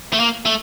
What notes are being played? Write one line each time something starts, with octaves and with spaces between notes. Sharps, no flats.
A3
A#3
A3